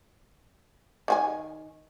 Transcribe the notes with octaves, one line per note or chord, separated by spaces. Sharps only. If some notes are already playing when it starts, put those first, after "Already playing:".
D#3 F4 G#5